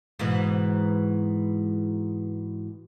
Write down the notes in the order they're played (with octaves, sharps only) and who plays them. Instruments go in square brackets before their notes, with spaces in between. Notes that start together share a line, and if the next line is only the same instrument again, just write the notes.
[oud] G#2 B2 E3